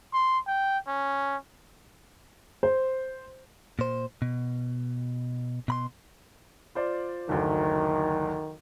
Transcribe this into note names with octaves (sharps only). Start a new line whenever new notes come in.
C6
G5
C#4
C5
A#2 C5
B2
B2 B5 C6
F4 C5 D5
F#1 D2 D#3